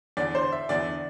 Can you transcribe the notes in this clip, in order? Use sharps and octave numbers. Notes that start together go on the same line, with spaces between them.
E2 D3 D5
C5
E5
E2 D3 D5